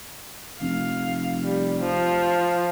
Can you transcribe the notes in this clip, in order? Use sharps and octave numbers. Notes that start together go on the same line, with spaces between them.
F1 F5
G3
F3